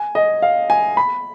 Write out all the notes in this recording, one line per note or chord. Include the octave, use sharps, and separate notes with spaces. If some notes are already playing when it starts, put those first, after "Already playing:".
Already playing: G#5
D#5
F5
G#5
B5